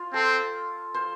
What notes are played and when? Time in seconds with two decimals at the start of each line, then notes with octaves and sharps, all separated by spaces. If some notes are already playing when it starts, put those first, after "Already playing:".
Already playing: F4 C5
0.13 C4 A4
0.94 C5